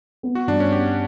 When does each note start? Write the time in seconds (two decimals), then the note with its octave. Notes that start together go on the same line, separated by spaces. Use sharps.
0.23 B3
0.35 F#4
0.47 G2 D4
0.60 C#4
0.72 B3 G4